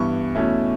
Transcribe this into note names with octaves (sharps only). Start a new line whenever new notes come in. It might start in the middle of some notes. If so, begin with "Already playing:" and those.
Already playing: G2 E3 B3 E4 C#6
E2 B2 A3 C#4 E4